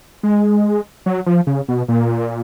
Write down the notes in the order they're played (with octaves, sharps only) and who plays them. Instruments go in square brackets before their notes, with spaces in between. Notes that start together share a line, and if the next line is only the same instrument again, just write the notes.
[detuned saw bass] G#3
F#3
F3
C#3
B2
A#2